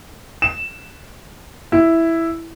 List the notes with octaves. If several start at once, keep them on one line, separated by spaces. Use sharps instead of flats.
E7
E4